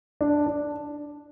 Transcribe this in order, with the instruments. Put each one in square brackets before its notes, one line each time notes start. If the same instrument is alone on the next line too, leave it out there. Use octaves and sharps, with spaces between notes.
[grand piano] D4
D4